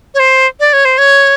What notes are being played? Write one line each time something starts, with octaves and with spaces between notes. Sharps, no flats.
C#5
C5
D5
C#5
C5
C#5